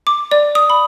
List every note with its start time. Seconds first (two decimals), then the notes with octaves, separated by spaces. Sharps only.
0.07 D6
0.31 D5
0.55 D#6
0.70 B5